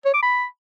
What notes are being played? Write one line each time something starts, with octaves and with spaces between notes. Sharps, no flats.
C#5
D6
B5